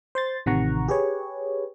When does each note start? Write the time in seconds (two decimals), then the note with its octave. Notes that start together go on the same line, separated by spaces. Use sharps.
0.15 C5 C6 A6
0.46 A1 C3 D#3 F#5 A#5 C#6
0.88 G4 G#4 B4 C#5